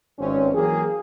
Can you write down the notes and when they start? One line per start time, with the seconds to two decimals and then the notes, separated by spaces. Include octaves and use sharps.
0.19 G#1 G2 C4 C#4
0.54 E3 F#3 A#3 G4 G#4